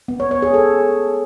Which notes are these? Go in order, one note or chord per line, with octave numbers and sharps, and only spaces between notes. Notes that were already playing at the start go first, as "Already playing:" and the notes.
B3
C#5
C#5
G#4
A4